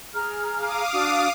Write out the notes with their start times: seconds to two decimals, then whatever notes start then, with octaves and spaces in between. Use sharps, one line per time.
0.14 G#4 A#5 F6
0.56 F5 D6 D#6
0.93 D4 F#4